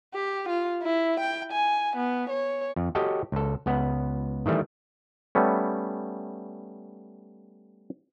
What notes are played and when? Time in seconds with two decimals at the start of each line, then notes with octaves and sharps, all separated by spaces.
0.14 G4
0.49 F4
0.82 E4
1.20 G5
1.52 G#5
1.96 B3
2.30 C#5
2.76 F2
2.95 F#4 G4 A4 C#5 D#5 G5
3.32 C#2 A4
3.66 C#2 B3 F#5
4.46 D#3 E3 G3 A3
5.35 G3 A3 B3 C#4